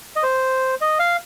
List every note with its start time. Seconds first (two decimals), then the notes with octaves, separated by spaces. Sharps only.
0.16 D#5
0.23 C5
0.81 D#5
0.99 F5